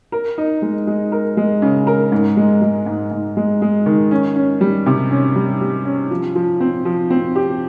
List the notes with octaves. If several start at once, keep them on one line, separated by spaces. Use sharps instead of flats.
A#4
D#4
G#3
G#3
A#4
G#3
C#3
A#4
G#2
G#3
G#3
G#2
G#2
G#3
G#3
D#3
C#4
C#4
G3
C3
C#4
G3
G3
C#4
F3
F3
C4
F3
C4
G4